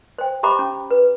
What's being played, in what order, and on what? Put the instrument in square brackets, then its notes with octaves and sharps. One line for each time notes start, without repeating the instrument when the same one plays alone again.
[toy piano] C5 G5
G4 C5 E5 A#5 B5 D6
C#4
B4